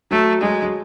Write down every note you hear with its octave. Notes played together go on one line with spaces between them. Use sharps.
F#3 A3
F#3 G#3
F#3